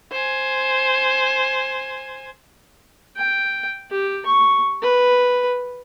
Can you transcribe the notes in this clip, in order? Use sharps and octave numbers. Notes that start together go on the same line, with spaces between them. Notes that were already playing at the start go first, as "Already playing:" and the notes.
C5 G#5
G5
G4
C#6
B4